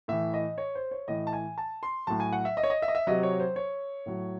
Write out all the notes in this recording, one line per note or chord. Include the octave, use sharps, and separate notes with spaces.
A2 E3 E5
D#5
C#5
C5
C#5
A2 E3 D#5
A5
G#5
A5
C6
A2 F#3 A5
G#5
F#5
E5
D#5
C#5
D#5
E5
D#5
E5
C3 F#3 D#5
C#5
C5
C#5
A2 F#3